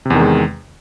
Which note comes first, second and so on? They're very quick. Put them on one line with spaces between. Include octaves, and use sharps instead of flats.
C3 E2 D#3 G#3